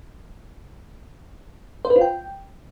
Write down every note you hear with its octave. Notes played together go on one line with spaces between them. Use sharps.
C5
B4
F4
G5